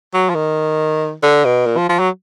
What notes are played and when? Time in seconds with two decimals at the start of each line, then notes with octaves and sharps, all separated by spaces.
0.14 F#3
0.29 F3
0.35 D#3
1.23 D3
1.45 B2
1.66 A#2
1.77 F3
1.89 F3
1.99 F#3